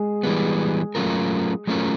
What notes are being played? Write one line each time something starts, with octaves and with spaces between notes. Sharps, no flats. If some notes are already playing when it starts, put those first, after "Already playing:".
Already playing: G#3 G#4
E3 G3 B3
F#3 A3 C#4 F4 A#4
F#3 A3 C#4 F4 A#4